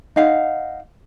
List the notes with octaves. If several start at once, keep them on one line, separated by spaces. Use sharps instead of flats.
D#4 F5 F#5